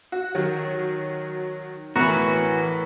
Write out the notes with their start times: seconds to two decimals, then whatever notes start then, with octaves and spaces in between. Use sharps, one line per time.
0.12 F#4
0.35 D#3 F#3
1.96 A2 E3 B3 F#4 A#4 B4